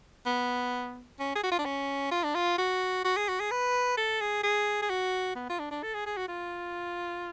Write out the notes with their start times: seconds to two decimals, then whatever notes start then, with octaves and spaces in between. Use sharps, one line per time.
0.26 B3
1.19 C#4
1.35 G#4
1.43 F#4
1.51 F4
1.59 D4
1.65 C#4
2.11 F4
2.24 D4
2.35 F4
2.58 F#4
3.05 F#4
3.17 G#4
3.28 F#4
3.40 G#4
3.51 B4
3.97 A4
4.21 G#4
4.44 G#4
4.82 G#4
4.90 F#4
5.36 B3
5.49 F4
5.59 D4
5.71 D4
5.83 A4
5.94 G#4
6.06 G#4
6.17 F#4
6.28 F4